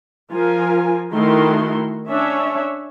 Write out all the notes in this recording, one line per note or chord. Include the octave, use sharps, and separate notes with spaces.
F3 F4 A#4 G#5
D#3 A3 E4 F#4 A#4 C6
C#4 D4 C#5 E5